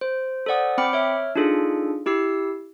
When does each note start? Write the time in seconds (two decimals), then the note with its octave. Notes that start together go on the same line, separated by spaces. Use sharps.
0.01 C5
0.46 A4 C5 D5 F#5 D#6
0.78 C4 G5 B5 D6 F6 C#7
0.93 C#5 E5 F6
1.35 D4 D#4 F4 G#4 A4
2.06 E4 G4 E6 C7